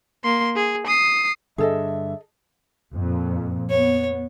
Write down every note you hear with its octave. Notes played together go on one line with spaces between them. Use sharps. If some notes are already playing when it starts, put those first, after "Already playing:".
A#3 C6
G#4
D#6 C7
G2 D3 G#4 A4 D#5 E5
F2 A#2
B3 C#5